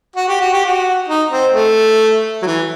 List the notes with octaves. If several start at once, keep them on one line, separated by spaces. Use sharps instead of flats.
F#4
G4
F#4
G4
F#4
D#4
C4
A3
F#3
E3